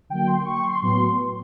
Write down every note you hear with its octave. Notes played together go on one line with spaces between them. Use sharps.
D3 F#3 A#3 G5
C6
C#6
C6
A2 F#3 B3 C6